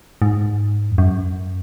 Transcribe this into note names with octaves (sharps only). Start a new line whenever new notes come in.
G#2
F2
F#2